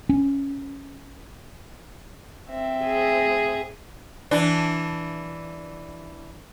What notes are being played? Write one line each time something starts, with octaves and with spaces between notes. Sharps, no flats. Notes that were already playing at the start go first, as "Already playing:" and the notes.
C#4
C4 E5
G#4
E3 D4